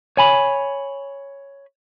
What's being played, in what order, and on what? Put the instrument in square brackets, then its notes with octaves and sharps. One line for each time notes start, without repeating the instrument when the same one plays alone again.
[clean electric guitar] C#5 G#5 B5